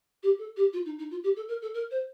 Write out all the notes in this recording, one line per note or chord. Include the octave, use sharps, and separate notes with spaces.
G4
A4
G4
F4
D#4
D#4
F4
G4
A4
A#4
A4
A#4
C5